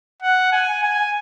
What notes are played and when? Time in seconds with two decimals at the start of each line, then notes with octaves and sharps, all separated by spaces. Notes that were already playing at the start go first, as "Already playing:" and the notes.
0.23 F#5
0.53 G#5
0.84 G#5